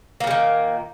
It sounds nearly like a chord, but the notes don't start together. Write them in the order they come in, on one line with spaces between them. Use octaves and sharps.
A#3 A#2 G3 D#3